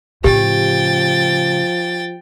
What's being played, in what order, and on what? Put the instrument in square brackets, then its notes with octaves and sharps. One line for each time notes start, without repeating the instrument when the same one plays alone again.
[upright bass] A2 C#3 [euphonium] F3 [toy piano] G4 [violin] G5 A6